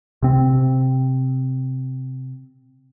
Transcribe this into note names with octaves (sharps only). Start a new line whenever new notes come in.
C3 C4